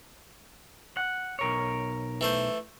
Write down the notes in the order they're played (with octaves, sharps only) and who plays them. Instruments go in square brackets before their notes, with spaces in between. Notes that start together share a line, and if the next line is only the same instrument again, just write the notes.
[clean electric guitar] F#5
B1 A#4 C#5
[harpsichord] E3 A3 C5